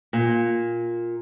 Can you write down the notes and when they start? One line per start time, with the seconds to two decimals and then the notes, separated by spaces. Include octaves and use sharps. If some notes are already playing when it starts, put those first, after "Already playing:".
0.13 A#2